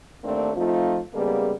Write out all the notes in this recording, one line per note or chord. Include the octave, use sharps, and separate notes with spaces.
D#2 A3 A#3 C4 D4
F3 A3 C4 D#4 F4
C#3 G3 G#3 A#3 B3 G#4